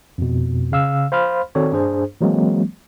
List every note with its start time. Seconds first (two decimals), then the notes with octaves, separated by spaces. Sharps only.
0.18 F2 B2
0.72 C#3 F5 E6
1.12 C5 F5 B5 C6 F6
1.55 D#3 C4 F#4 A4 C#5 D5
1.72 G2 D4 G#4 C5
2.21 E3 F#3 G#3 A#3 C4